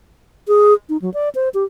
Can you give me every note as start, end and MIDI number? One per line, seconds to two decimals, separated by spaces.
0.48 0.74 68
0.89 0.97 63
1.02 1.12 54
1.14 1.29 74
1.35 1.49 72
1.54 1.64 67